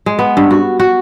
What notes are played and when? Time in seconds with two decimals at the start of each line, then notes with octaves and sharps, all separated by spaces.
0.06 G#3
0.19 B3
0.37 G2
0.51 F#4
0.80 F#4